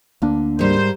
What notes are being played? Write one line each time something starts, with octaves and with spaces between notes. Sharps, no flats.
D2 D3 A#3 D4
G#2 G3 A#4 C5